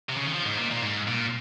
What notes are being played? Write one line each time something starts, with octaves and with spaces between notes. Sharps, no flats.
C3
C#3
D#3
F3
G#2
A#2
A#2
G#2
A#2